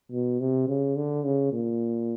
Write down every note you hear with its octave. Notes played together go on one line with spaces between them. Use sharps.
B2
C3
C#3
D3
C#3
A#2